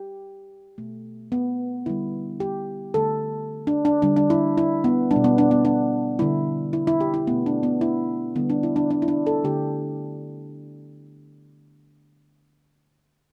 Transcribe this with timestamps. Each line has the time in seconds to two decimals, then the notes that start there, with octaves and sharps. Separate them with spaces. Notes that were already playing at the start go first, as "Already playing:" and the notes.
Already playing: G4
0.78 B2 A3
1.32 B3
1.86 D3 G3 E4
2.40 G4
2.94 D3 A3 A4
3.67 D4
3.85 D4
4.02 D3 G3 D4
4.16 D4
4.30 E4
4.58 E4
4.84 B3
5.11 G3 D4
5.16 B2
5.24 B3
5.38 D4
5.51 B3
5.65 D4
6.19 D3 G3 E4
6.73 E4
6.87 E4
7.01 G4
7.14 E4
7.27 B2 A3 B3
7.46 D4
7.63 B3
7.81 E4
8.35 D3 G3 B3
8.50 D4
8.63 E4
8.76 D4
8.91 D4
9.02 E4
9.08 D4
9.27 A4
9.44 D3 A3 G4